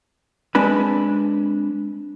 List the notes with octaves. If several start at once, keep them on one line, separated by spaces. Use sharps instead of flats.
G#3 C4 D4 B4 B5